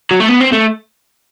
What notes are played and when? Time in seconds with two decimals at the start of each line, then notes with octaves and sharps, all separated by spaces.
0.11 F#3
0.20 A3
0.29 B3
0.41 C4
0.53 A3